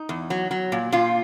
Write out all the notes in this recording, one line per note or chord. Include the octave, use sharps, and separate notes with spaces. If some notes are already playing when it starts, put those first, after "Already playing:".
Already playing: D#4
E2
F#3
F#3
A#2
A#2 F4